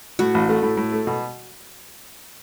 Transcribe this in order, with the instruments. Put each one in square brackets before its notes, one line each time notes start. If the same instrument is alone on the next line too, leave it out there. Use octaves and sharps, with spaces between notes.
[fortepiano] A2 [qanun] F#4
[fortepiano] A1
A3
A2
A2
A3
B2